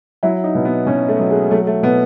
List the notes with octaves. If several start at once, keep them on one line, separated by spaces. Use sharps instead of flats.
F#3 E4
D#4
B2
B3
B2 C#4
A3
F#3
G#3
F#3 A3
A3
B2 B3